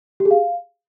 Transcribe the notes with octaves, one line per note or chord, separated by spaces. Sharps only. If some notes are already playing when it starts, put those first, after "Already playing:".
G4
G#4
F5